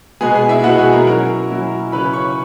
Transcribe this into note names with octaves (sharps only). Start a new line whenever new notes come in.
B2 G#3 B3 G#4 G#5
G#4 G#5
E4 E5
B2 G#3 B3 F#4 F#5
G#4 G#5
A#4 A#5
F#3 C#4 E4 A#4 A#5
F#3 C#4 E4
C#3 F#3 C#4 E4 B4 B5
C#5 C#6